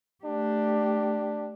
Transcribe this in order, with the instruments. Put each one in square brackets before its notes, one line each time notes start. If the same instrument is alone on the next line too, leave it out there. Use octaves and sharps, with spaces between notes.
[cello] A3 G4 [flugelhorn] D4